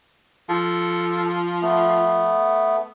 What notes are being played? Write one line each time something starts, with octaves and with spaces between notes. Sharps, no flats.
F3 A4
A3 B3